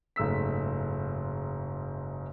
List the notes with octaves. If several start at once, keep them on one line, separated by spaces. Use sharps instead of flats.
F#1 G#2 A3 E6 B6